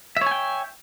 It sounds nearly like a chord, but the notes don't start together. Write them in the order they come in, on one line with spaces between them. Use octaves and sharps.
E5 C#5 G#5 G5